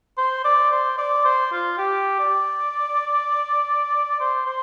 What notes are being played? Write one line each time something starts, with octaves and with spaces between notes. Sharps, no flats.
C5
D5
C5
D5
C5
F4
G4
D5
C5
C5